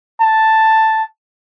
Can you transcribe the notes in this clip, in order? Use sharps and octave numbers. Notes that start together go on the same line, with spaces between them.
A5